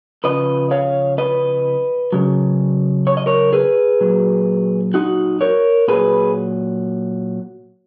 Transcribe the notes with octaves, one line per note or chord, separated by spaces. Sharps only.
C#3 F3 B4 D#5
C#5 F5
B4 D#5
C#3 F#3
C#5
D#5
A#4 C#5
G#4 B4
A#2 F#3
D#4 F#4
A#4 C#5
A#2 F#3 G#4 B4